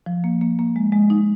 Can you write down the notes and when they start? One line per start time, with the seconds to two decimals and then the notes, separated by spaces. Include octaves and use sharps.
0.06 F3
0.24 A#3
0.42 A#3
0.59 A#3
0.76 G#3
0.92 G#3
1.10 D#4